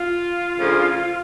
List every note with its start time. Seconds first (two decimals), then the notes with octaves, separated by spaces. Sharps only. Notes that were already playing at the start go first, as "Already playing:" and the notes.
Already playing: F4
0.58 D2 C#3 F3